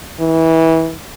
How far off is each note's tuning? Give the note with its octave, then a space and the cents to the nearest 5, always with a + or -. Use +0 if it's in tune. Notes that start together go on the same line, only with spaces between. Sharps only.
E3 -25